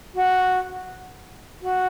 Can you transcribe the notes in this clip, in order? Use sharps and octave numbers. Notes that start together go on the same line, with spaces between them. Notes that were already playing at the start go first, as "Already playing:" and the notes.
F#4
F#4